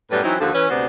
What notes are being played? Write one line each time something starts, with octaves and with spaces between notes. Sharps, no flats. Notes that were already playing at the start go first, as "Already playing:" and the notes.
F#2 A2 G3 B3 B4
E3 F#3 C4 C#4 D#4 E4
D#2 D3 F3 F#4 A4
E3 C#4 B4
D2 C3 B3 D4 F#4 C5